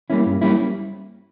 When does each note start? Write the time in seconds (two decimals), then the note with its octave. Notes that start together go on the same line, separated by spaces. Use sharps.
0.10 G3 A#3 C#4 E4
0.26 G2
0.42 G3 A#3 C#4 E4